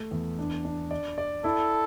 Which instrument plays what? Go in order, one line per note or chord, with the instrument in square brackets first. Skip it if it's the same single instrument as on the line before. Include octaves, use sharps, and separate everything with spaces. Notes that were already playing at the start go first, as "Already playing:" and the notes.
Already playing: [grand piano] A3
E2
D4
D4
D5
D5
[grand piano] E4 [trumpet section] A4